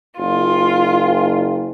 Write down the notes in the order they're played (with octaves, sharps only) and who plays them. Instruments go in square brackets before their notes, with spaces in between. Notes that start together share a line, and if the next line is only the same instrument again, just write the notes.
[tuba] F#1 [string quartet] F4